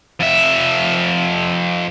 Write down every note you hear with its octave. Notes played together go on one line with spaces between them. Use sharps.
F2 E5